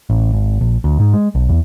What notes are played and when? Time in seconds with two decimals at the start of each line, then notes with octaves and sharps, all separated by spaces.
0.10 A1
0.33 G#1
0.61 A#1
0.84 D2
1.00 G#2
1.13 G#3
1.35 B1
1.49 E2